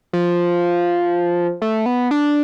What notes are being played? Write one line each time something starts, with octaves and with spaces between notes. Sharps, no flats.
F3
A3
B3
D4